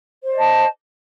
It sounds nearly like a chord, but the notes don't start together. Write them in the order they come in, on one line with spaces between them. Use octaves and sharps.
C5 D5 D#5 A5